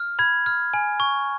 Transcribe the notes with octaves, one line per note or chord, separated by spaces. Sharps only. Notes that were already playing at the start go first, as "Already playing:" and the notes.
Already playing: F6
B5 G#6
F6
G#5
C#6